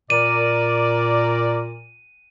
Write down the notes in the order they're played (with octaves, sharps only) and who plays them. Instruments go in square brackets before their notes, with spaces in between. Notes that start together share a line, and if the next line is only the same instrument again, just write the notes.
[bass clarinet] A#2 [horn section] A#4 D5 [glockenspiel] D#7